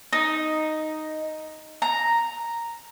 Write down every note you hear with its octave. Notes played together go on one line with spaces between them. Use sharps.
D#4
A#5